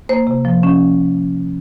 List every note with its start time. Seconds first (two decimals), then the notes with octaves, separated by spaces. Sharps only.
0.09 A#3 C5
0.27 C3
0.45 F3
0.63 C#4